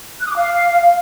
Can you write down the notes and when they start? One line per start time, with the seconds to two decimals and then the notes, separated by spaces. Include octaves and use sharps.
0.20 F#6
0.25 D#6
0.30 D6
0.35 F5